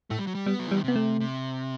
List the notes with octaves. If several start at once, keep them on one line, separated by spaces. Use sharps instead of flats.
A2 A3
G3
F#3
G3
G3 B3
F#3
E3
G3
D#3
C3 B3
A3
C3